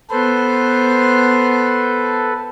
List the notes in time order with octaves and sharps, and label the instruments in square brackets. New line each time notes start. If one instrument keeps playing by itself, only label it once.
[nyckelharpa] B3 C5 [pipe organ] A4 B4